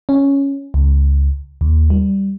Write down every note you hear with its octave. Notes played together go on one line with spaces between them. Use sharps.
C#4
C#2
D#2
G3